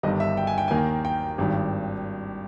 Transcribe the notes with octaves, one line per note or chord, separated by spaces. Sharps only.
G1 G2 D#3 D#5
E5
G5
G#5
G5
D#2 D#3 A#3 G#5
G5
G5
G#1 G2 D#3